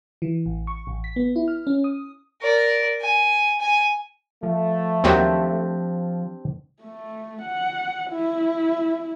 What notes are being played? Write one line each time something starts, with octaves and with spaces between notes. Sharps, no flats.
E3
A1
C#6
A1
B6
B3
E4
F6
C#4
D#6
A#4 D5
G#5
G#5
F3 A3
D#2 D#3 F#3 C4 D4 G4
A3
F#5
E4